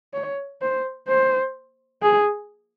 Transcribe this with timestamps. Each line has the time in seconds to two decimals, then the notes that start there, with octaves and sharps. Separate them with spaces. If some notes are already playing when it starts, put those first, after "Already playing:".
0.14 C#5
0.61 C5
1.08 C5
2.03 G#4